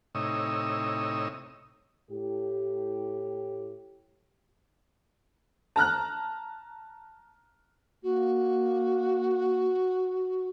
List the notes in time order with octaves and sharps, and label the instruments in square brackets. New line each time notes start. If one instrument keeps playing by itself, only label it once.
[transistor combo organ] A2 C3 D#4 C#5 D#6 E6
[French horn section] A2 G4
[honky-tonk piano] A5 A#5 F6 F#6
[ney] A#3 [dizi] F#4